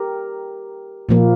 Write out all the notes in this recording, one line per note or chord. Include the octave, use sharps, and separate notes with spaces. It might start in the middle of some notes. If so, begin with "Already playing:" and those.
Already playing: G4 A#4
A#2 F3 A#3